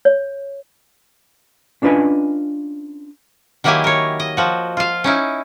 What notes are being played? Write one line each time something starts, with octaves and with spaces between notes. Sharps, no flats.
C#5
C#4 D4 F4 B4 D#5 G#5
D#3 F#3 A#3 E4 G4 G#5
A#4 C#5
D#5
F3 F#4
F4 F5
C#4 D#4 E4